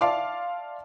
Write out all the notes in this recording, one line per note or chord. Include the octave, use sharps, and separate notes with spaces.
D5 E5 F5 A5 C6 D6